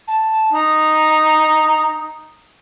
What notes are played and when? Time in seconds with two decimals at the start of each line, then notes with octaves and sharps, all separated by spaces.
0.08 A5
0.53 D#4 A#5